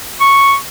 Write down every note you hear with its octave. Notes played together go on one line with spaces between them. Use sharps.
C#6